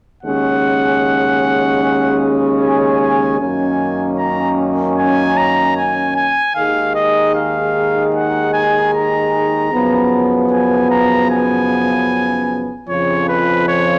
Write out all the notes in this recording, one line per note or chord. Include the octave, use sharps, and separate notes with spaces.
D#2 C#3 G#3 C#4 F#5
G#5
G#5
F#2 D#3 A#3 C#4 G#5
A#5
G#5
A#5
G#5
G#5
D#2 D#3 G#3 D#4 G#4 F5
D#5
F5
F#5
G#5
A#5
F#2 C#3 F3 B3
G#5
A#5
G#5
F2 C#3 F3 C#5
B4
C#5